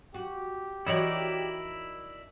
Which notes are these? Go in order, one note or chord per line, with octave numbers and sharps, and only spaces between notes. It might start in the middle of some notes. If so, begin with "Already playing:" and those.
F#4 G4
E3 D#4 E4 F#4 A#4 C#5 D5